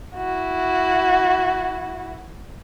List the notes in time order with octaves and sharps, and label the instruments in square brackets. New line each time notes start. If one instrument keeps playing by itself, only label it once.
[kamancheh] E4 F#4